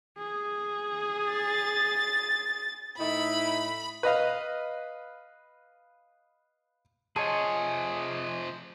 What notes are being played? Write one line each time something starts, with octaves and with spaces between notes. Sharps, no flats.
G#4
A6
A2 D#4 E4 B5
B4 D#5 F5
C3 F3 G#4 C#5 D#5 A5